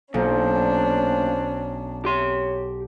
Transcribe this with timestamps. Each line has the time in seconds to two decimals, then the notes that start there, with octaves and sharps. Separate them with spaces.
0.14 B1 A#2 C#4 D4 C5
2.05 G4 C#5 C6